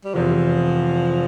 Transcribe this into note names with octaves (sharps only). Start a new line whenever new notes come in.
G3
F1 E2 C3 F3